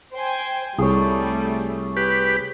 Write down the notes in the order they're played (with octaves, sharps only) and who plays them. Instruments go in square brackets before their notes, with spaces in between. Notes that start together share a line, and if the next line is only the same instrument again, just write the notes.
[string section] C5 G5 G#5
[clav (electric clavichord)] C2 [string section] G3 A3 [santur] G#4 C#5
[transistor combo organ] G4 B4